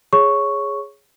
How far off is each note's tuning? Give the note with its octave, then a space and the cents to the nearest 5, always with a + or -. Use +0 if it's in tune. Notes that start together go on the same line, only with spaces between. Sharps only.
G#4 +0 C#5 +0 C#6 +0